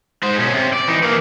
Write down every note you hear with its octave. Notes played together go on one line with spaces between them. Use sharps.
G#3 C5
B2 C#4
C3
D5
E3 D#4
E3 A#3